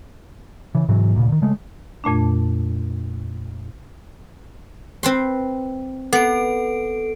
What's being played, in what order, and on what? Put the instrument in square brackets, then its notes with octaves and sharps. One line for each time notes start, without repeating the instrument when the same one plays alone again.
[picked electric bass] C#3 E3
G#2 C3 E3 F#3
D2 A#2 C#3
D3 D#3
C#3 G#3 A3
[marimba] F2 A#2 A3 D4
[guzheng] C4 B4 C6
[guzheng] B3 [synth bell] A4 D7